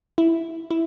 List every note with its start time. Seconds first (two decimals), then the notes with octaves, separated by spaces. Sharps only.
0.18 E4
0.71 E4